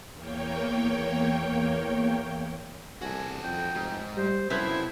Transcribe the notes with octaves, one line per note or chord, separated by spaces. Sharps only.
E2 A#3 C#5 G5
C2 F#4 A4 G#5
F2 G5
F1 G#2
G3 C5
F#2 C3 B3 E4 A4 C5 E5